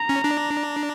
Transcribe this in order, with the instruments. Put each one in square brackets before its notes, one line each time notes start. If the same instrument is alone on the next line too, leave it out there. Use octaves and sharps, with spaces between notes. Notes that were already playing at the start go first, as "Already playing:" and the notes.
Already playing: [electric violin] A#5
[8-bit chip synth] C#4
D4